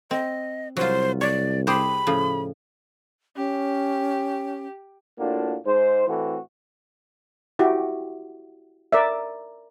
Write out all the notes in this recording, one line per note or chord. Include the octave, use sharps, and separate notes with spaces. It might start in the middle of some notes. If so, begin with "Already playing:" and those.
C4 D#5
C2 F#3 F4 C5
C#5 D5
G4 G#4 C5 B5
A2 C#3 F3
C#4 G4
A2 A#3 D4 F4 F#4
G#2 C5
A2 E3 A3 C4 F#4
E4 F#4 G4
A#4 D5 E5